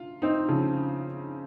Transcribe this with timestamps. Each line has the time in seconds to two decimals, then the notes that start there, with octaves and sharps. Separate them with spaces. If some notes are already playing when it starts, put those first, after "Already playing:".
Already playing: F4
0.22 C4 D#4
0.49 C#3 F3